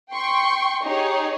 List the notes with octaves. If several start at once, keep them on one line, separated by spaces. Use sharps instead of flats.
G5 C6 C#6
D#4 G4 G#4 C#5